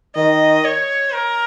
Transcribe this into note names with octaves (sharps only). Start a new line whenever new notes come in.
D#3 D#5
C#5
A#4